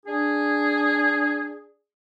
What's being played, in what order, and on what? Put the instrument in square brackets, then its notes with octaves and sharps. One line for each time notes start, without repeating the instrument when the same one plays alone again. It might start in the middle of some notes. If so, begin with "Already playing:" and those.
[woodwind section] D4 G#4